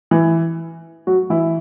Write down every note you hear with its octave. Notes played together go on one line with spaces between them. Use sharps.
E3 E4
F#3 F#4
E3 E4